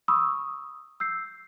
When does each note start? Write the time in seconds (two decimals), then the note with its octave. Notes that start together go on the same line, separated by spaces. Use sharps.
0.08 B5 C#6 D#6 E6
1.00 E6 G6 C7